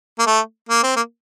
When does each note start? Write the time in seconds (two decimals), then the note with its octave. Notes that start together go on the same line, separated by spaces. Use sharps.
0.19 A#3
0.26 A3
0.69 A#3
0.83 C4
0.96 A#3